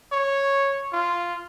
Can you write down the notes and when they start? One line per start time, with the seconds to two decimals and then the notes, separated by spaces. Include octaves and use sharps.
0.12 C#5
0.92 F4